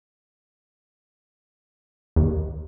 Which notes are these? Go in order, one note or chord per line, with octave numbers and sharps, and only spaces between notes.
D#2